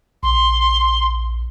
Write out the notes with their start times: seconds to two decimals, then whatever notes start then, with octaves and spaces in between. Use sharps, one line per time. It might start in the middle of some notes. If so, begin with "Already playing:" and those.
0.23 A#1 C6